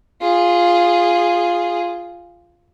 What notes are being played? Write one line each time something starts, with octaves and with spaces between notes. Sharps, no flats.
F4 G#4